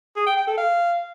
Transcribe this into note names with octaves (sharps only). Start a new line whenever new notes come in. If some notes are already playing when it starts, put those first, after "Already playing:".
G#4
G5
G5
A4
F5